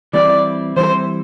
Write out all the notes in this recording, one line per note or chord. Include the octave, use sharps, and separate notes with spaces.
E3 G3 C4 E4 D5
E3 G3 C4 E4 C5